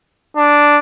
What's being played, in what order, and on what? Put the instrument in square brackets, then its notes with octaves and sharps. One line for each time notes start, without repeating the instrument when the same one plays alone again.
[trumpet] D4